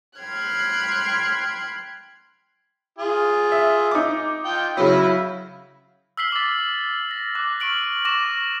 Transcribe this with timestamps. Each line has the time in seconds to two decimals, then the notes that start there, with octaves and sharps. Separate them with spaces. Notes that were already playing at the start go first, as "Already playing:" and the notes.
0.20 G5 B5 C6 F6 F#6 G#6
2.99 F4 G#4
3.52 E5
3.91 D#4 D6
4.45 F4 G5
4.77 C#3 F#3 E4 B5
6.17 E6 F6 B6 C7 F#7 G7
6.32 D6 A6
7.11 A#6
7.35 D6 F#6
7.60 C#6 F6 D7 F#7
8.05 C#6 D6 A#6 E7